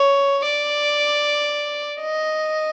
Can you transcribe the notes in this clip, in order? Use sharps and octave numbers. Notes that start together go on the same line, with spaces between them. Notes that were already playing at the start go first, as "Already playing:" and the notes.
Already playing: C#5
D5
D#5